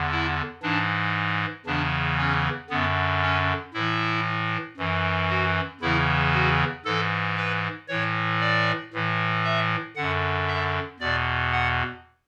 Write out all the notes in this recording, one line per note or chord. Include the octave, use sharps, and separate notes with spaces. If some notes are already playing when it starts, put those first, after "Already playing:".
Already playing: E2 D3
E4
G#2 E3 D4
E2 C#3 E3 D4
C#4
F#2 D3 B3
C#4
A2 E3 E4
F#2 E3
F#4
E2 C#3 E3 E4
F#4
G#2 E3 A4
B4
A2 E3 C#5
D5
A2 E3
E5
F#2 D3 F#5
E5
E2 B2 D5
F#5